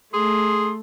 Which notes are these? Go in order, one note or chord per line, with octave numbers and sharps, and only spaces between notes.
A3 G#4 C6